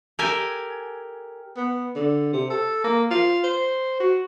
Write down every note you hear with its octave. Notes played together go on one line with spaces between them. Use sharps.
G4 A4 A#4 G#5
B3
D3
C3
A4
A#3
F4
C5
F#4